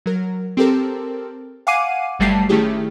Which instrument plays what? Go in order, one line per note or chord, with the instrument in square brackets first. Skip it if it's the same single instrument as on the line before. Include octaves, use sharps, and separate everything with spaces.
[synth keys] F#3 A#4
C4 G4 A4 A#4
F5 F#5 G#5 D6 C7 D#7
G1 F#3 G3 A3 A5 C7
D#3 A3 C#4 E4 G4 G#4